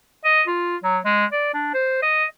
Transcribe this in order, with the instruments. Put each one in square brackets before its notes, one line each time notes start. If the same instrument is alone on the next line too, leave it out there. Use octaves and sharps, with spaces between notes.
[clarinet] D#5
F4
F#3
G#3
D5
D4
C5
D#5